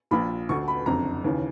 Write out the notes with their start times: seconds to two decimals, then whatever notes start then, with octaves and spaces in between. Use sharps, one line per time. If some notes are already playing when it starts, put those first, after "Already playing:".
0.11 A#1 A#2 B5
0.49 D2 D3 C#6
0.68 B5
0.86 F#1 F2 D3 A#5
1.24 D#2 C#3 E3